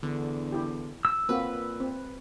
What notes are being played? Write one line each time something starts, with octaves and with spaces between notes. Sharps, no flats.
E2 D3
E4 G4
E6
A#2 A#3 C4 F#4 B4
C4